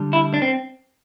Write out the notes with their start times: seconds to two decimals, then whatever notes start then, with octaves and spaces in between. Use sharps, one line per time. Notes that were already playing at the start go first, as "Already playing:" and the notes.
Already playing: D3 G3
0.13 E4
0.34 D4
0.42 C4